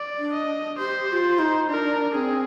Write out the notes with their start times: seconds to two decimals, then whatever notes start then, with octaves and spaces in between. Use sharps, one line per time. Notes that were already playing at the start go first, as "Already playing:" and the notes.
Already playing: D5
0.18 D4
0.33 D#5
0.78 G4 C5
1.08 G4
1.12 F4
1.39 D#4
1.69 D4 A#4
2.14 C4 G#4